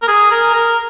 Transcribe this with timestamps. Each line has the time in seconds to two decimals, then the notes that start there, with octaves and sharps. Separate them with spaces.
0.02 A#4
0.08 G#4
0.31 A#4
0.54 A#4